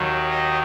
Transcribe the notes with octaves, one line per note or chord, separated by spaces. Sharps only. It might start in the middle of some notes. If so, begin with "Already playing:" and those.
Already playing: D#2 D#3 F#3
D#5